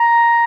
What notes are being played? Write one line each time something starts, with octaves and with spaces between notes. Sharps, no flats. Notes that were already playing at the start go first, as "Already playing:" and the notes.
Already playing: A#5